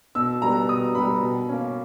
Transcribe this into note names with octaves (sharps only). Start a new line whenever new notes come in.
B2 E6
G3 B3 A#5
B2 D#6
G3 B3 B5
B2
A#3 C#4